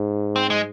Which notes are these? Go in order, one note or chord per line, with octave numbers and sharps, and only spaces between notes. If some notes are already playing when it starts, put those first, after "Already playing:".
Already playing: G#2
C4
G#3